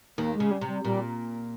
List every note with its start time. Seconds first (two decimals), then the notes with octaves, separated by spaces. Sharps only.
0.18 D#2 D#3 A#3
0.34 G#3
0.40 C#3
0.51 G3
0.61 C3
0.67 G3
0.84 A#2 G3